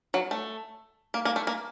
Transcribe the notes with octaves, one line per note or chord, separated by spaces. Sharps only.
F#3
A3
A#3
A#3
A3
A#3